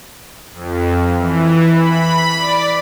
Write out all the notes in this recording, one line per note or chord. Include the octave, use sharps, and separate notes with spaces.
F2
E3
B5
D5